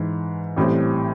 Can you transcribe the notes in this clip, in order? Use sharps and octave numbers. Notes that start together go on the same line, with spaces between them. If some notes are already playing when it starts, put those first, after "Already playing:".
Already playing: G#2 E3
A1 A2 E3 G3 C4